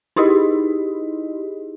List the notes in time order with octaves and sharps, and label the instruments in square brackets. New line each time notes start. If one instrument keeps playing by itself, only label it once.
[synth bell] D#4 E4 G4 G#4 D#5